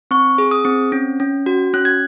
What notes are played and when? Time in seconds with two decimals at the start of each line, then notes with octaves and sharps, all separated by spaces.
0.11 C4 C#6
0.38 G#4
0.51 D#6
0.65 C4
0.92 C#4
1.20 C#4
1.46 F#4
1.74 C#4 F#6
1.85 G#6